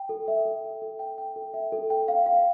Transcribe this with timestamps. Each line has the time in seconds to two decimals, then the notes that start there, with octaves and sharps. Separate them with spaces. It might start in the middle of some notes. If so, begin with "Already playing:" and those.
Already playing: G5
0.09 A4
0.28 E5
0.45 A4
0.64 A4
0.82 A4
0.99 G5
1.18 G5
1.36 A4
1.54 E5
1.72 A4
1.90 G5
2.08 F5
2.26 F5